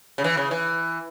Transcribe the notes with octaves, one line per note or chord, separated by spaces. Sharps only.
C#3
E3
C#3
E3